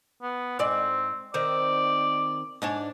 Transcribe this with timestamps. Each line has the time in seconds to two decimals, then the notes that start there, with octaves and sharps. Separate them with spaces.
0.22 B3
0.59 G#2 C4 D5
1.34 D#3 C4 D5
2.62 G#2 D4 C#5